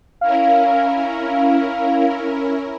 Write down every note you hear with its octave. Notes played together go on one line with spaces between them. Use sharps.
C#4 E4 A#4 F5